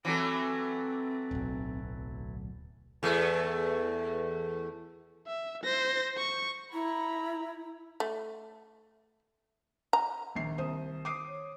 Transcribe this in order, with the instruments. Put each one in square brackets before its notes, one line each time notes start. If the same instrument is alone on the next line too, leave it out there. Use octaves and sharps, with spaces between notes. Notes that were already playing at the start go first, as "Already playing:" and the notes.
[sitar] E3 F#3 A3 [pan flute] C4
[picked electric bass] D1 B1
[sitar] E2 A3
[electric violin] E5
C5 A#6
C#6
[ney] E4 [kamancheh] A#5 B5
[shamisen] A3
A#5
[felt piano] A#1 C7 [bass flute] D#3
[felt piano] C2 C5 D#6
D6 D#6 C7
[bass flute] C#5